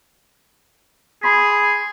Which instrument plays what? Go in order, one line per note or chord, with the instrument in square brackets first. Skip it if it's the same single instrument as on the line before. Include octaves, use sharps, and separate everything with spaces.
[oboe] G#4 [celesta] B5 C6 B6